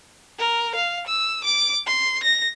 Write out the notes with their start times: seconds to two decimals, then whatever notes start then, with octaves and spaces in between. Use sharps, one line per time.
0.39 A#4
0.75 F5
1.07 E6
1.45 D6
1.87 C6
2.23 A#6